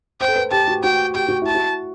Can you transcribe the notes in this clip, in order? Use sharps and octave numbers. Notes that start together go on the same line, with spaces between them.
C5 G5
A4
B4
G4 A5
F#4
F#4 G5
G4 G5
F#4
E4 A5
F#4